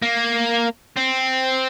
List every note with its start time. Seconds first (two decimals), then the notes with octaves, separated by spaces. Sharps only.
0.02 A#3
0.97 C4